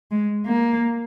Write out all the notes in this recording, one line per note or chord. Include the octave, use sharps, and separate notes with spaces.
G#3
A#3